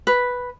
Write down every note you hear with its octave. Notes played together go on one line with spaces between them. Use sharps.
B4